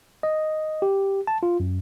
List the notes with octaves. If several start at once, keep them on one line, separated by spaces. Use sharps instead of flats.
D#5
G4
A5
F4
F#2